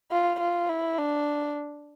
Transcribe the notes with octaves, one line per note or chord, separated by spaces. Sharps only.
F4
F4
E4
D4